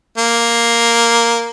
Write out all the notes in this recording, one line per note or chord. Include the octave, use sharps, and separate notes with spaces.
A#3